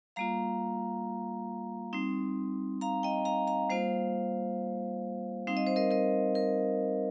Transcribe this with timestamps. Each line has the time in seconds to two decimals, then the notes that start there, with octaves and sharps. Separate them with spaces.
0.16 G3 A#3 F4 F5 A#5
1.93 G3 C4 D#4
2.81 F5 A#5
3.03 D#5 G5
3.25 F5 A#5
3.47 F5 A#5
3.70 G3 A#3 F4 C5 F5
5.47 G3 C4 D#4 F5
5.57 D#5
5.67 C5
5.76 A#4 D#5
5.91 A#4 D#5
6.35 A#4